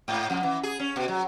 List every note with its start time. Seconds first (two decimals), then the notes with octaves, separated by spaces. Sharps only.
0.08 G#2
0.30 F2
0.43 E3
0.63 G#4
0.79 C#4
0.96 B2
1.08 F#3